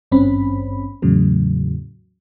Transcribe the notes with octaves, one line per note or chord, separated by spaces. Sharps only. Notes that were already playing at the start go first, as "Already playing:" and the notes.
G#1 G2 C4 C#4 B5
E2 A2 C#3 F#3